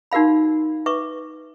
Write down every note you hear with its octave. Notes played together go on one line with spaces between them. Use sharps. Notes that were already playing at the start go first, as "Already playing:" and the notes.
D#4 F#4 A#4 F5 B5
B4 E5 C#6 D6